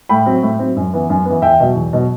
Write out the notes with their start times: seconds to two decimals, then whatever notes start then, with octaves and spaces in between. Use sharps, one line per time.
0.09 A2 G5 B5
0.26 F#3 C4
0.43 A2
0.59 F#3 C4
0.76 F#2
0.93 E3 B3
1.10 F#2
1.25 E3 B3
1.42 E2 E5 G5
1.60 B2 F#3
1.75 E2
1.93 B2 F#3